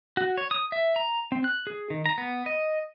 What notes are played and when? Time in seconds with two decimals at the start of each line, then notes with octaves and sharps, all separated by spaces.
0.17 F#4
0.38 C#5
0.51 D#6
0.72 E5
0.96 A#5
1.32 C4
1.44 F#6
1.67 G#4
1.90 D#3
2.06 A#5
2.18 B3
2.46 D#5